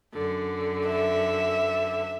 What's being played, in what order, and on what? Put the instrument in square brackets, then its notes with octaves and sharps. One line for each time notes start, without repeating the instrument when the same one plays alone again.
[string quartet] F#2 D3
[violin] E5